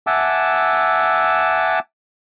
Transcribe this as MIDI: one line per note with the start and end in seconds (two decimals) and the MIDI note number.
0.07 1.79 76
0.07 1.79 78
0.07 1.79 80
0.07 1.79 81
0.07 1.79 86
0.07 1.79 88